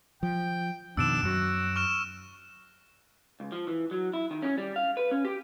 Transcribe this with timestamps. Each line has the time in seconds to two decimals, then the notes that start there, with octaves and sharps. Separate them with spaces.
0.23 F3 G5
0.97 F2 B2 D#3 D4 E6 D7 E7
1.23 F#2 F#3 F#4
1.76 C#6 F6 E7
3.40 C#2
3.52 F3
3.68 E3
3.91 F#3
4.13 E4
4.31 D#3
4.42 C#4
4.58 G3
4.76 F5
4.97 B4
5.11 C#4
5.25 G4